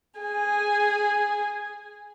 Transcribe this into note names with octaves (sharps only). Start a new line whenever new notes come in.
G#4 G#5